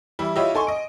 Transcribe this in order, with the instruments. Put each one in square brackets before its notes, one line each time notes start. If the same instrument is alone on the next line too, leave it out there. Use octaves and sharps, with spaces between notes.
[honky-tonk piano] E3 G3 E4
E4 F4 G4 C#5 D#5 E5
D#4 A4 G#5 C6 C#6
D#5 D7